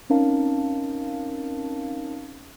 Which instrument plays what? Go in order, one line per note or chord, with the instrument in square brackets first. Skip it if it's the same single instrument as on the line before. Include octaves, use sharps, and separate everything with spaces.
[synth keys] C4 C#4 D#4 A#4 F5 A5